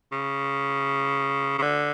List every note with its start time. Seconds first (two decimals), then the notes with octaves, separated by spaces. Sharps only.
0.12 C#3
1.58 C#3
1.62 D3